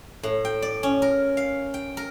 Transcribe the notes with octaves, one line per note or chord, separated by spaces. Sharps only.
A2
G5
D5
C#4
A#4
F5
G5
A#4